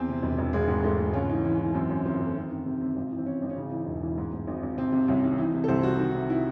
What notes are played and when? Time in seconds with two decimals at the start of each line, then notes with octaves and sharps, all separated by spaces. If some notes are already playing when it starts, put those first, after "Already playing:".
Already playing: E2 C4
0.09 C3
0.23 E1
0.39 E1
0.53 G#1 G#3
0.68 G#2
0.84 G#2 A3
0.99 G#2
1.13 C#2 C#4
1.29 E3 D#4
1.45 E3
1.60 E3
1.74 F#2 C4
1.89 F#2 C#4
2.06 F#1 C4
2.20 F#1
2.26 A3
2.35 D#3 C4
2.51 D#3
2.66 C3
2.81 C3
2.96 G#1
3.11 E3
3.18 C4
3.26 G#1 C#4
3.42 G#1 D#4
3.49 C#4
3.57 C#3 D#4
3.71 E3
3.87 E1
4.02 E3
4.18 G#2
4.33 G#2
4.47 G#1 D#4
4.63 G#1
4.77 C3 C4
4.92 C3
5.08 C2 C#4
5.23 D#3
5.38 E3 D#4
5.54 C3
5.64 A4
5.68 C2 C5
5.83 C2 F#4
5.99 D#3
6.14 C3
6.29 D#3 E4